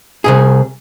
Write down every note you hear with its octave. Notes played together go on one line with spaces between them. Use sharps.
C2 F#2 G#4